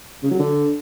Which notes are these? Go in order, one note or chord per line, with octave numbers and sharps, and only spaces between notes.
C#3
F#3
D3